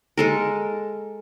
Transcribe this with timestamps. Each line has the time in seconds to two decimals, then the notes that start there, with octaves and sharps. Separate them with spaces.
0.18 G#3 A4 A#4